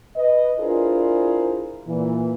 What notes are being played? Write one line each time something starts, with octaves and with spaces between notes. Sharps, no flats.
B4 D#5
D4 E4 F4 G#4 A#4 C5
A#2 E3